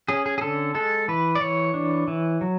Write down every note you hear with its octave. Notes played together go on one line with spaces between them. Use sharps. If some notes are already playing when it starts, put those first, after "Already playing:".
C#4 G#4
G#4
G#4
D3 A4
G#3 A4
E3 B4
D5
E3 C#5
D4
E3
F#3